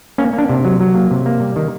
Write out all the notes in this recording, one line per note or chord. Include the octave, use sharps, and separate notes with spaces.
A#3 C#4
A#3
D4
C3
F#3
F#3
A#3
C3
A#3
G3
D#3